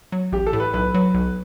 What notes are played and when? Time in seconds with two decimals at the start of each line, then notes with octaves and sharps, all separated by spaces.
0.12 F#3
0.32 A1 G4
0.47 A4
0.53 A2
0.60 B4
0.74 B1 B4
0.94 F#3
1.14 B1